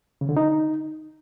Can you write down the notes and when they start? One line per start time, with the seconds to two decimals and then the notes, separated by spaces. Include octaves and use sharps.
0.21 C#3
0.29 D3
0.37 D#4